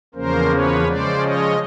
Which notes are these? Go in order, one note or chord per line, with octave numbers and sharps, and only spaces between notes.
E2 C#3 F3 A#3 C#4 A#4 C5
B4 C#5
C#3 F3 G#3 C#4 C5 D5
C#5 D#5